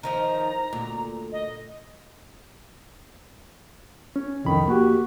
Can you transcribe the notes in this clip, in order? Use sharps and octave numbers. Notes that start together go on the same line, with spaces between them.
D#3 F3 D#4 A#5
D2 A#2
D#5
C#4
C2 F2 D#3 B5
A#3 F#4 G4